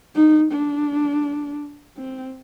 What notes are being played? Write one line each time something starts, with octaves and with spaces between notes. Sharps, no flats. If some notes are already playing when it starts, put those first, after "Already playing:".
D#4
D4
C4